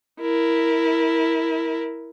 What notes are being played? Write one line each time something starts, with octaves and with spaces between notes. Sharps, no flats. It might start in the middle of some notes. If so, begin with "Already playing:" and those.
E4 A#4